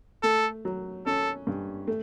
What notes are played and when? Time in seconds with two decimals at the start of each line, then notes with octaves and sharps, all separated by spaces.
0.23 A3 A4
0.65 F#3
1.06 C#4 A4
1.47 G2
1.88 A3